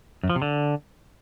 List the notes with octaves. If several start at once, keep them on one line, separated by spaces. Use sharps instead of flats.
F#2
F3
C3
D3